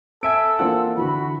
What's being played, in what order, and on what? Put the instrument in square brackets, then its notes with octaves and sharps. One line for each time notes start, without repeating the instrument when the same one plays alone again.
[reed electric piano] C4 E5 G#5 [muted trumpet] A4 [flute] E6 [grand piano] D7
[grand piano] E3 A#3 F4 [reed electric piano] C4 D4 F#5
[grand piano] D3 E3 [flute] F#4 [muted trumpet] B5